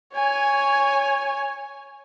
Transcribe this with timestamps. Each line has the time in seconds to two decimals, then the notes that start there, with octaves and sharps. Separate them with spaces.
0.13 C#5 G#5